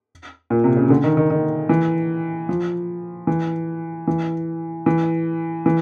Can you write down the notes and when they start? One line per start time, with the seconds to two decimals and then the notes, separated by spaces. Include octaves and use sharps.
0.50 A#2
0.64 C3
0.77 C#3
0.90 D3
1.04 D#3
1.17 D#3
1.30 D#3
1.69 E3
2.49 F3
3.27 E3
4.07 E3
4.86 E3
5.66 E3